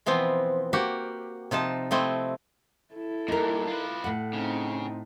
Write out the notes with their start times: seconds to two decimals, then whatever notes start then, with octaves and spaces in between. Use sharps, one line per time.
0.06 B2 E3 F3 B3 C4
0.73 A#3 F#4 G4
1.51 C3 F3 D#4 A5
1.91 F3 A3 C4 E4 D#5
2.94 E4 A4
3.28 G2 A#2 D#4 A#4
3.67 F4 B4
4.04 A2 F#5
4.33 C#3 C4 D#4